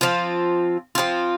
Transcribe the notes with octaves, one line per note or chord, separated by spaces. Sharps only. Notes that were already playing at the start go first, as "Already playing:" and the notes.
F3 C4 F4
F3 C4 F4